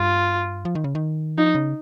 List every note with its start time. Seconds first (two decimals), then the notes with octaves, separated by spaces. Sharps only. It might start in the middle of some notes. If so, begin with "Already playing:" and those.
Already playing: G2 F4
0.65 F3
0.75 D#3
0.84 C#3
0.95 D#3
1.38 F3 D#4
1.55 C#3